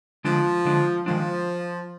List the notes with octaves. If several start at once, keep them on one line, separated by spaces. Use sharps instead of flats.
D3 F3 G#3 D4
D3 G#3 D4
D#3 F3 G#3 D4